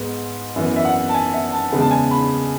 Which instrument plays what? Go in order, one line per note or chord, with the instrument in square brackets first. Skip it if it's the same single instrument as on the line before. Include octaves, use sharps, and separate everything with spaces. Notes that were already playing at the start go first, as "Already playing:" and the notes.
Already playing: [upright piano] G#2 G#3 B3
F#2 E3 B3
E5
F#5
A5
G#5
E5
A5
E2 C#3 G#3 B3
A5
G#5
B5